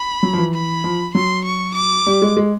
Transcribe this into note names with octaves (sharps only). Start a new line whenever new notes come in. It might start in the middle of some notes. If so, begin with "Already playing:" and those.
Already playing: B5
F#3
F3
E3
B5
F3
F#3 C6
C#6
D6
G3
G#3
G#3